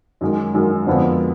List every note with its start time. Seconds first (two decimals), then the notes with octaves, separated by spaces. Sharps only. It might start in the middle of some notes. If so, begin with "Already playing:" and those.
0.21 F#2 D#3 G#3
0.54 F#2 D#3 G#3
0.87 F2 D3 F3 G#3 B3